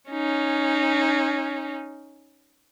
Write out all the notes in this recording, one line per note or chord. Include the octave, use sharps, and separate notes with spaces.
C#4 D#4